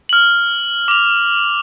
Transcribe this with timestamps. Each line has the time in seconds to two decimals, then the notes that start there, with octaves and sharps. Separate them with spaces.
0.09 F6 F#7
0.88 D6 F7